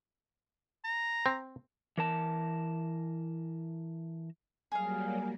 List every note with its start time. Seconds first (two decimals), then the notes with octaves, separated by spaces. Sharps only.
0.85 A#5
1.26 C4
1.98 E3 A#4 A5
4.72 F#3 G3 A#3 G#4 F5